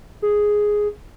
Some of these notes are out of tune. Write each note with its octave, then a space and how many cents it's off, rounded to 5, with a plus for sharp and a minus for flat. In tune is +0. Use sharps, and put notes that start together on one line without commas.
G#4 +0